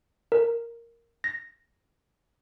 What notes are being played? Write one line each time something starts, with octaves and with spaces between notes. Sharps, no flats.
A#4
A#6